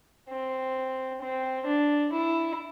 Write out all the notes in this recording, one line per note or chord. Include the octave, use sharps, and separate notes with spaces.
C4
C4
D4
E4